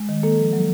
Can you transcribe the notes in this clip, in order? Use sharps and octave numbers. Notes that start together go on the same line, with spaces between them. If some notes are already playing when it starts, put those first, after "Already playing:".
Already playing: G#3
D#3
A#3 A4
F3
F#3